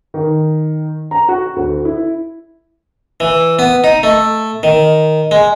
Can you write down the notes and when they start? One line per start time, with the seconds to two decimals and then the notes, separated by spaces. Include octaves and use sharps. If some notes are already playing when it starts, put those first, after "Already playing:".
0.14 D#3
1.11 A#5
1.28 F#4
1.56 D2
1.85 E4
3.20 E3
3.59 B3
3.84 D#4
4.03 A3
4.63 D#3
5.31 G#3